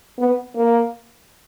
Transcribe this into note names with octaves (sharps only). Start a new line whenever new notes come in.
B3
A#3